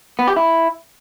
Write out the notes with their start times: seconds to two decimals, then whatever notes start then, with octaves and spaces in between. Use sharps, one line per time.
0.19 B3
0.28 G4
0.36 E4